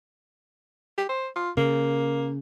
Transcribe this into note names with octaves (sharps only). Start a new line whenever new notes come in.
G4
C5
F4
C#3 A#3